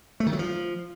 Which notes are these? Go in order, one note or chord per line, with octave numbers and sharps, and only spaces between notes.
A3
D#3
F#3
F3